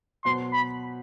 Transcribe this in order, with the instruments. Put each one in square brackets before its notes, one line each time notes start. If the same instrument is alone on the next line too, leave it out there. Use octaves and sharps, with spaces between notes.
[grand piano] B2 F#3 B3 F#4 C5 [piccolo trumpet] C6
[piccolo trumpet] B5